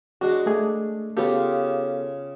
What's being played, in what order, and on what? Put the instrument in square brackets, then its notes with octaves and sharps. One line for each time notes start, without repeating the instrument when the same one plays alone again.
[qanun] G#3 D4 [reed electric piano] F#4
[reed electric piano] A3 G#4
[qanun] C#3 F4 G4 [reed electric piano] B3 A4